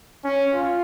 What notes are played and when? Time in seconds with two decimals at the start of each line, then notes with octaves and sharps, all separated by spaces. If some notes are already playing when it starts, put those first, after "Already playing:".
0.24 C#4
0.54 F4